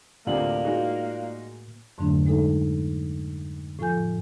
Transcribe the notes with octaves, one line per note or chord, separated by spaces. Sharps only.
D2 A2 C3 A#3 F4 D5 F#7
G#3 D#4 F#4
F2 G#2 D3 F#3 A3 D4
G#3 D#4 A4
A2 F3 F4 A4 G#5 G6